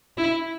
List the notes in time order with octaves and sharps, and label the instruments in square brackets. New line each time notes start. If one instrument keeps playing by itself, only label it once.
[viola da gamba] E4